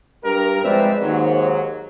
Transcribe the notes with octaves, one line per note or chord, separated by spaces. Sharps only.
G2 A#4
F3 G#3 C4 B4 D5 E5
D#2 G#2 F#3